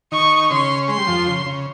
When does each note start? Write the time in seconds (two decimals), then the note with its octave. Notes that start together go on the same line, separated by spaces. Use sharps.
0.12 D#3 D#4 C#6
0.50 C#3 C#4 C6
0.88 G#3 C6
0.98 G3
1.07 F2 F3
1.27 C#3
1.46 C#3